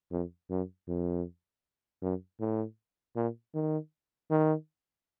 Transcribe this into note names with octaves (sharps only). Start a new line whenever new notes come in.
F2
F#2
F2
F#2
A2
A#2
D#3
D#3